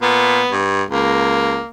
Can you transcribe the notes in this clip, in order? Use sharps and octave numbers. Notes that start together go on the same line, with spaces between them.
A#2 B3
G2
C#2 A#3